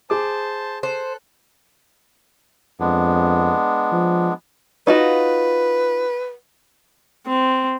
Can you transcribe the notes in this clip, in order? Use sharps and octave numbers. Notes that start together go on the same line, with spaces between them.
G#4 C5 A5 D6
A4 C5 F#6
F2 G#3 B3 D4
F3
D#4 F4 F#4 B4
C4